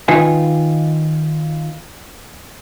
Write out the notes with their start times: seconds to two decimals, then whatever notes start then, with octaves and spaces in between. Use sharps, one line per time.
0.08 D#3 D#4 F4 B4 G#5